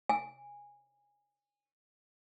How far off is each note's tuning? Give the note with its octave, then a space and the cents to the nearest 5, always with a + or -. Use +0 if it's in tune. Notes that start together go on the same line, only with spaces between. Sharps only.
G#5 -15